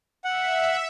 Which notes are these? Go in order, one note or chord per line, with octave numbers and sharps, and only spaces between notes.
E5 F#5